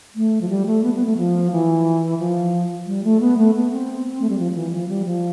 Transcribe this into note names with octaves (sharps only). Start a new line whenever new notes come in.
A3
F3
G3
A3
B3
B3
A3
F3
E3
F3
G3
A3
B3
A3
B3
C4
A3
G3
F3
E3
F3
G3
F3